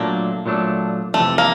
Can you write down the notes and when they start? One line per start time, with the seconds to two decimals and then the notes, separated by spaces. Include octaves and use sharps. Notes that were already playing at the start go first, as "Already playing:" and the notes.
Already playing: A#2 F#3 A3 A#3 D4
0.46 A#2 F#3 A3 D4
1.14 F2 C3 E3 A3
1.38 A#3